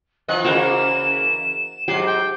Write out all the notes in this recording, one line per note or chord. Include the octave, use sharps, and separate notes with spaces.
E3 F3 D#5 F#6
C#3 E3 A#3 F#4 A#4 C5 E7
G#2 F#3 G4 C7
G5